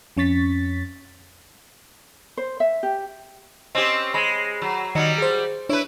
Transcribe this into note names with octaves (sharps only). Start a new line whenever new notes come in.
F2 C#4 C#6 A6 B6
C5
E5
G4
C4 C#4 G4 D#5
G#3 B5 A#6 C7
F#3
D#3 F#3 G3 D#5 C#7
G#4 C5
D4 E4 B4 C#5